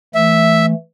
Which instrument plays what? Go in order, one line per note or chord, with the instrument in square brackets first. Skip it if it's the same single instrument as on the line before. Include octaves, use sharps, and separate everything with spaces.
[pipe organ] E3 A3 [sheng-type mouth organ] E5